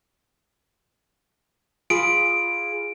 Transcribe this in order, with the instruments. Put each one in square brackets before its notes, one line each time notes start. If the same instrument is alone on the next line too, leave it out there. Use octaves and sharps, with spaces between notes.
[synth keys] F4 G#4 B5 [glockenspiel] D7